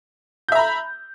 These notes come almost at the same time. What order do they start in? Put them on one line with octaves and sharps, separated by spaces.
G6 E5 A#5 B5